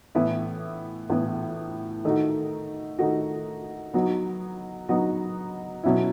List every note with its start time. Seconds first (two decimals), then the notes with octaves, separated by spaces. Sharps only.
0.15 A2 E3 B3 E4
1.10 A2 E3 B3 E4
2.05 D#3 A3 D#4 F#4
2.99 D#3 A3 D#4 F#4
3.94 F#3 B3 D#4 F#4
4.89 F#3 B3 D#4 F#4
5.83 B2 F#3 C#4 E4